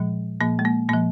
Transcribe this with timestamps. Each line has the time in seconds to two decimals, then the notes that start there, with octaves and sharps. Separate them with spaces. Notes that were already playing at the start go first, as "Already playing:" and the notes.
Already playing: A#2 F3 G#3
0.41 A#2 F3 A#3
0.59 G#3
0.65 A#3
0.89 A#2 F3 A#3